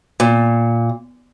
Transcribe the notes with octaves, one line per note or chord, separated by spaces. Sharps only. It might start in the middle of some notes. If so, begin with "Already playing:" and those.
A#2